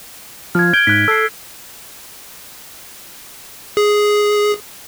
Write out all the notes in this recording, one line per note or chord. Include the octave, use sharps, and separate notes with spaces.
F3 F6 G#6
G6 G#6 D7 G7
G#2 F#6 B6
A4 E6 C7
G#4